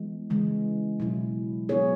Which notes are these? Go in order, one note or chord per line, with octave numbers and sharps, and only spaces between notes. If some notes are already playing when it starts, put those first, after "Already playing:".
Already playing: E3 G#3 B3
C#3 E3 G#3
B2 F#3 E4
F#3 B3 E4 G#4 C#5